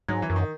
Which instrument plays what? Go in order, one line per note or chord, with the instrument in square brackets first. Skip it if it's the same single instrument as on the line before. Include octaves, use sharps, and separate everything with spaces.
[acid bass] G#2 [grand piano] F#3
[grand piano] E3
[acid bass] F#2
[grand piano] D#3